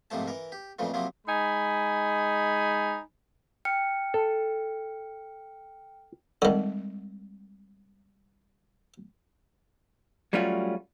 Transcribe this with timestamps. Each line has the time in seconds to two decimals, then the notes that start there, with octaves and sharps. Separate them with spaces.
0.10 A#1 G#2 C3 F3 A3 A5
0.28 E3 A#4
0.52 G4
0.79 F2 A#2 C#3 E3 F3 A3
0.94 C3 F3 F#3 A#3 E4
1.27 G#3 D#4 G#5 B5
3.65 G5 F6 C#7
4.14 A4
6.42 D3 D#3 G3 G#3 C4
10.33 F#3 G3 A3 C#4 F4 F#4